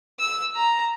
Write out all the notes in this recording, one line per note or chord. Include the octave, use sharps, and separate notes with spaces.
E6
A#5